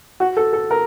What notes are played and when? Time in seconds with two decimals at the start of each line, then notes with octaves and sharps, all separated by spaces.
0.20 F#4
0.37 A4
0.53 A4
0.71 A#4